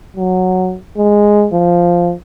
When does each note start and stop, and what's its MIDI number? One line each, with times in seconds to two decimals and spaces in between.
0.16 0.76 54
0.97 1.47 56
1.53 2.12 53